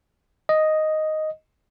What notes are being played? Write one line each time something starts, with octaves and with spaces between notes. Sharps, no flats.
D#5